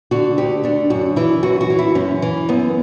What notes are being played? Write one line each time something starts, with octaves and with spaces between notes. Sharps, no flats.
D3 F#4
D2 G4
D3 D4
F#2 F#4
E3 E4
F#2 F#4
F#4
E3
E4
F#2 C#4
E3
F#2 B3